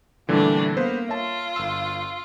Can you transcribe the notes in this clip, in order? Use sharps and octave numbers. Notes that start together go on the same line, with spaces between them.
A#2 D3 E3 G3 A3 D4
A#3 B3 B4 C5
F4 C#5 E5 A5
G1 E6